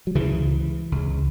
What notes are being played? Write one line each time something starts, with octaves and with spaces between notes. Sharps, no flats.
F#3
C#2 C#3 E3
C#2 C#3